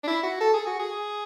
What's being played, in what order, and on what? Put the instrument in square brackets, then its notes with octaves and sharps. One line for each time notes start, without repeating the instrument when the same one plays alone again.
[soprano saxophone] D4
E4
F#4
A4
G#4
F#4
G#4